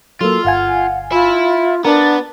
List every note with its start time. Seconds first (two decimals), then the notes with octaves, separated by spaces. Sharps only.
0.21 F#3 A#3 F4 A4
0.45 G1 F5 F#5 G#5
1.12 F4 E5 B5
1.85 B3 D4 A#4 F#5 A6